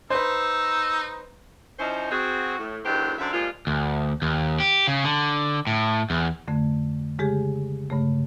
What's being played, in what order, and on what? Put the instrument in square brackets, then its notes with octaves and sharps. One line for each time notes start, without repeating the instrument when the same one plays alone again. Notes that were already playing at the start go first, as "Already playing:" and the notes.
[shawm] D#4 [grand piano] B4 C5 [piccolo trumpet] E6
[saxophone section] F3 C#4 D#4 E4 C5
C4 F#4 G#4
A2
E2 D3 D#3 F#3 G4 C5
F#2 D3 C5 D5 E5
A#2 F3 G3 G#3 F4
[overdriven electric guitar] D2
D#2
G4
C#3
D3
A2
E2
[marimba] F2 D3 A3
C#3 G#3 G4 G#4
G2 C#3 A3